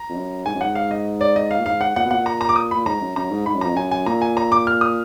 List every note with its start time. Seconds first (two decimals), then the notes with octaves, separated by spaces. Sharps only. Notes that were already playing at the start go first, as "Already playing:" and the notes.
Already playing: A#5
0.09 F2
0.15 F#2
0.46 G#2 G#5
0.55 F#2
0.61 G#2 F#5
0.75 F5
0.91 D#5
1.21 D5
1.36 D#5
1.51 F5
1.59 A#2
1.65 G#2 F5
1.81 F#5
1.96 A#2 F#5
2.05 B2
2.11 A#2 F#5
2.26 A#5
2.41 A#5
2.49 D6
2.56 D#6
2.71 A#2 B5
2.86 G#2 A#5
3.01 F#2
3.16 F#2 A#5
3.31 G#2
3.46 G#2 B5
3.55 F#2
3.61 F2 A#5
3.74 F#2 G#5
3.91 G#5
4.06 A#2 A#5
4.22 G#5
4.37 A#5
4.52 D6
4.67 F6
4.81 D#6